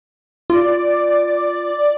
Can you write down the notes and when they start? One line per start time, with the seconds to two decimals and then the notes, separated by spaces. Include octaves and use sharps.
0.50 F4 D5